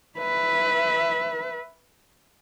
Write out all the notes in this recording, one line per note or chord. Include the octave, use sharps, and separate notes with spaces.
B4 E5